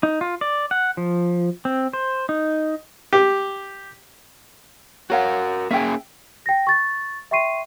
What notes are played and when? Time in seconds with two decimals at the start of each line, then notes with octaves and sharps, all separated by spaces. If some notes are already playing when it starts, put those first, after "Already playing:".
0.03 D#4
0.21 F4
0.41 D5
0.71 F#5
0.97 F3
1.65 C4
1.93 C5
2.29 D#4
3.13 G4
5.10 F#4 A#4 C#5 F5 F#5
5.71 A#3 C#4 G#4 E5 G5
6.46 G5 A#6
6.67 C#6 A6
7.31 E5 G5 C6 C#6 C7 D#7